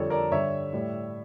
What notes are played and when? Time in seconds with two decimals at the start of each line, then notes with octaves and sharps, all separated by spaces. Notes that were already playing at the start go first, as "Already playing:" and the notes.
Already playing: F2 D3 G3 A4 C#5
0.10 A#4 D5
0.31 G2 D3 G3 C#5 E5
0.73 A2 G3